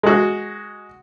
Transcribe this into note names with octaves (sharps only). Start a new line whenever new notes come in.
G#3 F#4